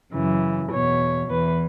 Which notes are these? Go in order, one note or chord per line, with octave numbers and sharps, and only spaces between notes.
F#2 C#3 E3
E2 B2 C#5
E2 E3 B4